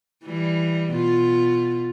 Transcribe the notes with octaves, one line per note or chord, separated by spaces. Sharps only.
E3 G3
B2 F4